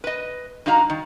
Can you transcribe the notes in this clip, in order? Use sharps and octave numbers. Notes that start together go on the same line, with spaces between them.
B4 D#5
G2 D#4 F#4 F5 A#5
D#3